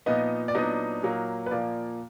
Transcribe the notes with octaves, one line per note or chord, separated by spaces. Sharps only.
A#2 F3 B3 D#4 D#5
D5
A#2 F#3 B3 D4 D#4 D#5
A#2 F#3 A#3
B4
A#2 F3 A#3 D5